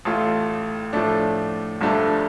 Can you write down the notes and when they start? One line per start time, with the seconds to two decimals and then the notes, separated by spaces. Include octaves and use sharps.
0.05 A1 A2 A3 F4
0.93 A2 F3 A3 D4
1.81 G1 G2 F3 A3 D4